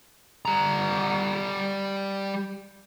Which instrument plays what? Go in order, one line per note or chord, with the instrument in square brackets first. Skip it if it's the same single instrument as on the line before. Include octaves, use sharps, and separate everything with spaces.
[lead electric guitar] G3 A#5